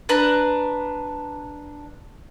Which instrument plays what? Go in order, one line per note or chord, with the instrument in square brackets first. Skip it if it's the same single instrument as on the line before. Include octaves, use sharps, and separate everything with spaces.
[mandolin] D4 B4 A#5